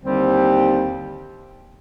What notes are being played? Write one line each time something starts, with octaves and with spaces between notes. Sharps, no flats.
D#2 D3 G3 C4